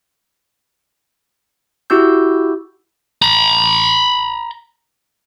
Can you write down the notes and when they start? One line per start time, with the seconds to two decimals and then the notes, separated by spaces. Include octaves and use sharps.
1.90 E4 F#4 G4 E6 G6
3.22 A#5 B5